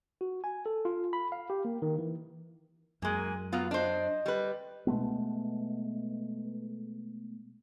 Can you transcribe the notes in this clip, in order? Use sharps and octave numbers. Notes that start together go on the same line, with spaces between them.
F#4
G#5
A4
F4
B5
F5
G4
A#3
D#3
E3
F#2 G#3 A#3 G#5
F#3 B3 F4 F5
D4 C5 D#5
G3 B4
B2 G#3 A3 B3